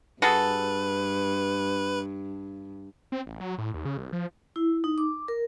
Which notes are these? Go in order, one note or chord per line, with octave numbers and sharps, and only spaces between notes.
G2 F#4 G#4 A4 B4
C4
A1
F#3
A2
D#2
C#3
C2
F3
E4
D#4
D6
A#4